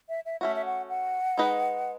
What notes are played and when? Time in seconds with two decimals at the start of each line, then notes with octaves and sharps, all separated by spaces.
0.09 E5
0.25 E5
0.41 A3 C#4 F#4 E5
0.56 E5
0.65 F#5
0.89 F#5
1.38 G#3 D#4 G#4 B4 D#5